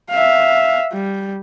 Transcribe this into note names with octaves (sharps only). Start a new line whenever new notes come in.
E5 F5
G3